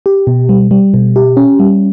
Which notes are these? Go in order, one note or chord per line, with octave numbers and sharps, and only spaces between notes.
G4
B2
G3
G3
B2
G4
C#4
G3